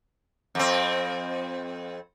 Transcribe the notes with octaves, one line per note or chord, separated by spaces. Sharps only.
F2 C4